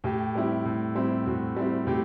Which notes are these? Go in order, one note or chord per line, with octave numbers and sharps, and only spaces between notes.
A2 G4
G3 C4 E4
A2
G3 C4 E4
A2 F#4
G3 C4 E4
A2 G4